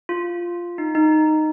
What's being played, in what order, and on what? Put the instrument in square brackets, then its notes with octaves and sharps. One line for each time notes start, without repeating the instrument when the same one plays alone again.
[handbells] F4
D#4
D#4